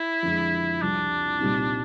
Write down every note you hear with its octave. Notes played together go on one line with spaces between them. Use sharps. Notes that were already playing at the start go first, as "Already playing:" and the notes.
Already playing: E4
F2 D3 F3 G#3
C2 C3 F3 D4
C2 A#2 G3 C4 D#4